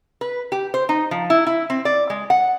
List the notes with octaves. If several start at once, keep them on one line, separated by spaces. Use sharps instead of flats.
B4
G4
C5
D#4
F3
E4
E4
C4
D5
G#3
F#5